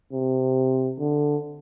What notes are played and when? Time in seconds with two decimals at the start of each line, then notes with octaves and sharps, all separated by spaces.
0.12 C3
0.99 D3